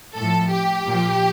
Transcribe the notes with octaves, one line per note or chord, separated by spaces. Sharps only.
A2 F3 A4
G4
A#2 F3